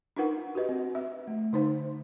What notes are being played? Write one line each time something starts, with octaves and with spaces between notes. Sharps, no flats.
D4 D#4 F4 A#4 B4 F#5
F#4 G4 B4 D#5
C4
E5
A3
D3 D#4 C5